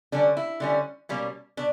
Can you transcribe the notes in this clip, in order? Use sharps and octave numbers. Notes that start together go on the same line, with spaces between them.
D3 G3 C#4 D4
E4
D3 G3 C#4
B2 G3 A#3 C#4
B2 D4